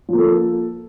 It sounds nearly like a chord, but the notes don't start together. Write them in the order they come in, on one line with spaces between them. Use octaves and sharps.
F3 A#3 A4